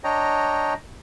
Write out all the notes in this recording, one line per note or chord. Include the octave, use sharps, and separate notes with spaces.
D4 C#5 D#5 G5 A#5